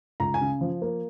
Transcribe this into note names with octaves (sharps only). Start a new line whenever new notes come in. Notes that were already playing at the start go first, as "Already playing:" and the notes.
C#2 A#5
G#5
C#3
F3
A#3